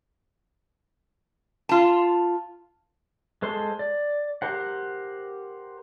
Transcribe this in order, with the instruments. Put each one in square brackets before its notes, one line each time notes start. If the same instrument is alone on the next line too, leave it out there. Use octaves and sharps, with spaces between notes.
[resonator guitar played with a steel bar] F4 A5
[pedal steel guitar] G#3 A4 C5 C6
D5
G4 A#4 C5 F#5